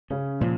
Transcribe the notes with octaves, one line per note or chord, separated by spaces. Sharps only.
C#3 C#4
A#2 F3